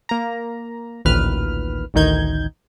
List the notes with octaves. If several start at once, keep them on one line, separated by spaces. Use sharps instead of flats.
A#3 A#5
A1 D2 A#2 D#3 B4 F6
A1 D2 D#3 D#4 G6 G#6